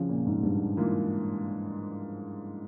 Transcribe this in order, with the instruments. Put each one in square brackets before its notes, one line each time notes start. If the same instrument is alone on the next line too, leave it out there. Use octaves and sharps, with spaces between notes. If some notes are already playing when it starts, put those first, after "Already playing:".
Already playing: [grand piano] C2 [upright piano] C#3 F3
[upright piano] A#2
G#2
G2
[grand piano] G#2 E3 A#3 F4